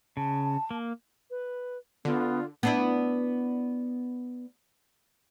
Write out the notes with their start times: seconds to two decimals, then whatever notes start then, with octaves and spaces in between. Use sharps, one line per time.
0.17 C#3 A5
0.71 A#3
1.30 B4
2.05 D3 B3 F4
2.63 B3 D4 E4